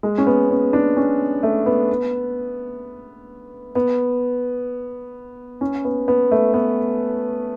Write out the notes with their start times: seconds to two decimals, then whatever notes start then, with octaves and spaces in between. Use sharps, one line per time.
0.03 G#3
0.18 C#4
0.27 B3
0.50 C#4
0.73 D4
0.97 C#4
1.43 A3
1.66 B3
3.75 B3
5.61 C#4
5.84 B3
6.08 B3
6.31 A3
6.54 B3